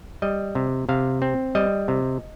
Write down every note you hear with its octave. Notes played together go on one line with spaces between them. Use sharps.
G3 D#5
C3
C3 F5
C4
G3 D#5
C3